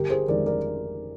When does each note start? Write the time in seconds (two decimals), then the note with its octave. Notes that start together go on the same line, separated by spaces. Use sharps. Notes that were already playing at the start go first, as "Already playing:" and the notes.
Already playing: G1 G4 A#4
0.10 G#4 C5
0.28 F2 D#3 G#3 A#4 D5
0.46 A#4 D5